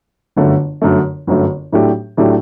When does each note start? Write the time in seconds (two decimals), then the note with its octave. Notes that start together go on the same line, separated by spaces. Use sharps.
0.36 G1 F#2 D3 A3
0.82 G1 F#2 D3 A3
1.27 G1 F#2 D3 A3
1.72 A2 F#3 A3 D4 G4
2.17 A2 F#3 A3 D4 G4